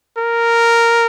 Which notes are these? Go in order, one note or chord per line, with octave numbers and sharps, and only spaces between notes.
A#4